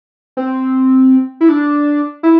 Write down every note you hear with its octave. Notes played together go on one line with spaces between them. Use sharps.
C4
E4
D4
E4